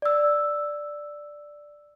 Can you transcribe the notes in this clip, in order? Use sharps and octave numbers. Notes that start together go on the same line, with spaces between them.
D5 E6